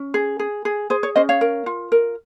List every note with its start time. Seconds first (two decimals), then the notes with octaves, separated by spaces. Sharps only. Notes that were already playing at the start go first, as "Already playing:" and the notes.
Already playing: C#4
0.14 G#4
0.39 G#4
0.65 G#4
0.90 G#4 C5
1.03 C#5
1.16 C#4 C5 D#5
1.29 C#5 F5
1.41 A#4
1.66 F4
1.92 A#4